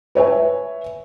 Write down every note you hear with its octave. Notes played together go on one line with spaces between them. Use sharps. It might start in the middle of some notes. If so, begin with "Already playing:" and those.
B4 C#5 E5 G#5